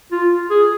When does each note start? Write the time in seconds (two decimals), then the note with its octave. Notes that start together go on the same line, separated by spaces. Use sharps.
0.12 F4
0.50 G#4